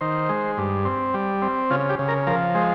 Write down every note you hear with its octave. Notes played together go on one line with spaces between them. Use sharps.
D#3 C5
G#3
G2
C4
G3
C4
C#3 F4
G4
C#3
A#4
F3 A#4
G#3 C5